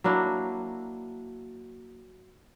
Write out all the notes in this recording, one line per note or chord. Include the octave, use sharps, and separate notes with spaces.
F#3 A#3 D4 E4